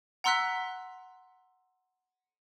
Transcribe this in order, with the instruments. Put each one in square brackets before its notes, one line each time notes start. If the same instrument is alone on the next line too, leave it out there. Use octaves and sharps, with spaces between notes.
[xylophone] F#5 A#5 C6 E6 F#6 B6